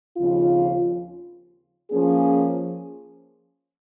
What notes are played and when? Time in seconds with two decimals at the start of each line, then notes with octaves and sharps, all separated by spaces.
0.17 D#2 C#3 F3 C4 F4
1.90 F3 A#3 C#4 G#4